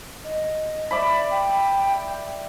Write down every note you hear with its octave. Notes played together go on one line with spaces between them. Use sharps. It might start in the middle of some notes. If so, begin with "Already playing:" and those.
D#5
D5 E5 B5
G5